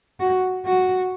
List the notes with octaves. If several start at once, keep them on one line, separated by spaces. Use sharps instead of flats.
F#4
F#4